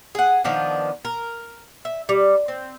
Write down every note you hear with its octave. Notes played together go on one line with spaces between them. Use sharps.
G#4 F#5
D#3 F3 B3 D4
A#4
E5
G3
C4